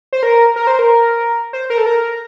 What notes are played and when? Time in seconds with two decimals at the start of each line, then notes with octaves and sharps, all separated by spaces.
0.13 C5
0.23 A#4
0.56 A#4
0.67 C5
0.79 A#4
1.53 C5
1.70 A#4
1.78 A4
1.86 A#4